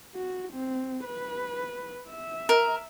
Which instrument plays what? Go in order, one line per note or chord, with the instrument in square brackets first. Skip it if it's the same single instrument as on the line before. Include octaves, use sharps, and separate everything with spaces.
[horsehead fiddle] F#4
C4
B4
E5
[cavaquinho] A#4